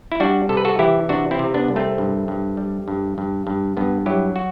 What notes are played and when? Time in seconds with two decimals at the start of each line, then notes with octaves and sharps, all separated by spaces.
0.12 E4
0.20 G3 D4 F#4
0.49 C3 A4
0.57 B4
0.65 F#4 A4
0.79 E3 E4 G4
1.09 C3 D4 F#4
1.31 C4 E4
1.39 C3
1.54 B3 D4
1.68 C2
1.76 A3 C4
1.98 G2
2.28 G2
2.57 G3
2.88 G2
3.18 G2
3.47 G2
3.77 G2 B3
4.06 F#3 E4 G4
4.36 F#4